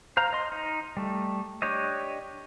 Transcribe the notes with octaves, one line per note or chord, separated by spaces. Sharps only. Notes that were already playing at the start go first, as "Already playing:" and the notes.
C5 F5 A#5
D#5 C6
D#4
G3 A3
D4 G4 C#5 D#5